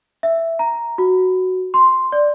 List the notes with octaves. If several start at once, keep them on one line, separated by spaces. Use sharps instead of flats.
E5
A#5
F#4
C6
D5